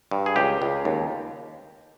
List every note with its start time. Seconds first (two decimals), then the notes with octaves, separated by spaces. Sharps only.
0.11 G2
0.26 G#4
0.36 C#2 G4
0.62 C#2
0.85 D#2